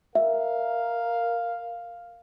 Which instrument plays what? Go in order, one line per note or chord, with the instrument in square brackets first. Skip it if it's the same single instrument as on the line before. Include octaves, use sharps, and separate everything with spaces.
[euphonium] A#4 [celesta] E5 [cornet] F5